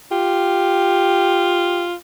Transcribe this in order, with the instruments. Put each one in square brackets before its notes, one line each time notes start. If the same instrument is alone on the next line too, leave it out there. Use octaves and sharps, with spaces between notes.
[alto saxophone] F4 [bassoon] G4